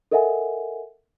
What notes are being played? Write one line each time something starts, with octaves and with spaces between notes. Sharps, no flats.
A4 A#4 D#5 E5 F#5 G#5